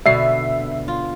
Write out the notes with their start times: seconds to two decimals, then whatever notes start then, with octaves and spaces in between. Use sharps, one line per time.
0.06 B2 D3 B3 E5 C7
0.88 F4